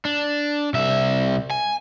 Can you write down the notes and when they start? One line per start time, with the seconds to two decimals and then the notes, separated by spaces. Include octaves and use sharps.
0.05 D4
0.74 C2 E5
1.50 G#5